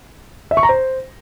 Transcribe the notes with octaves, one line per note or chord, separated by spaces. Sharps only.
E5
C#6
A#5
C5